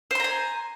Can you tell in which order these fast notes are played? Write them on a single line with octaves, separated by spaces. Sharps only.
C5 C6 A#5 G#5